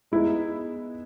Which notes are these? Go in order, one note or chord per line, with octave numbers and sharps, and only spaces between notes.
G#3 B3 D#4 E4